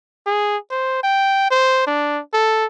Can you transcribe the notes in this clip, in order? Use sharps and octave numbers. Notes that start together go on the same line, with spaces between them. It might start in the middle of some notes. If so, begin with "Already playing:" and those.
G#4
C5
G5
C5
D4
A4